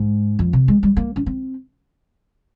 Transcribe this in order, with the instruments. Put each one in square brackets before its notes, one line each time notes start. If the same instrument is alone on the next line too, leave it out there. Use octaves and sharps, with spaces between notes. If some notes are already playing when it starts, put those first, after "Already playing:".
Already playing: [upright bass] G#2
F2
C3
G#3
G3
A#3
C#4
C4